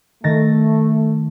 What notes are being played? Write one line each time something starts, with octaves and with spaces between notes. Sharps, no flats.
D#3 A3 A6 A#6